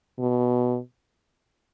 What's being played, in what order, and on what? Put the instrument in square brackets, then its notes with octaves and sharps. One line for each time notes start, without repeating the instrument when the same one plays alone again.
[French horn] B2